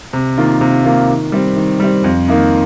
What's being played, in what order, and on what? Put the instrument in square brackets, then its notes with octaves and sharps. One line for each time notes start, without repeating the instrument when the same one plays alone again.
[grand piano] C3
D#3 A#3 F4
C3
D#3 A#3 F4
D#3
G3 C4
D#3
G3 C4
F2
D#3 A#3 D#4